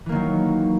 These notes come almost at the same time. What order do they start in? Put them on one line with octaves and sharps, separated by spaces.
E3 A#3 D#3 F#3